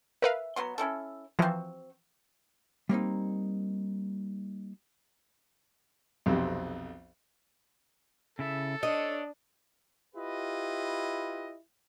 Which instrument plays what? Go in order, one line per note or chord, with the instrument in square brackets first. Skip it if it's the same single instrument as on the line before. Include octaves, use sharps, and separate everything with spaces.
[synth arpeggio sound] A#4 B4 F5 [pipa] E5
[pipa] F#3 B3 C6
C#4 E4 A4
[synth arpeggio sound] E3 F3 [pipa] C4 F#4
[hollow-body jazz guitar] G3 A#3 C4 D#4
[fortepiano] B1 F2 C3
[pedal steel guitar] C#3 E4 E5 [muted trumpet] A4
[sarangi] D4 [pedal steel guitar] C#5 [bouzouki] D#5
[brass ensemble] E4 F4 G4 B4 D#5